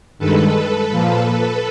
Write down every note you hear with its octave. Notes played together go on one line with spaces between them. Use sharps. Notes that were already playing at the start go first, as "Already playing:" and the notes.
G2 D#3 G#3 A4 B4
A#2 F3 A#3